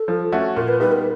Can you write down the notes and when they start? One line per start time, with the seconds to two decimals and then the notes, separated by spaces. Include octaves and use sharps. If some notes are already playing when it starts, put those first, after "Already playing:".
Already playing: A4
0.08 F3
0.32 A3 C#4 F#4
0.56 A#2 A#4
0.68 B4
0.80 G3 B3 D#4 G4 B4
0.92 A#4